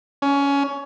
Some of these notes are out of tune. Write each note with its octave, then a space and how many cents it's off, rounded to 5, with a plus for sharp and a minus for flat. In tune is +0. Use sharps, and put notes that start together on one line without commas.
C#4 +20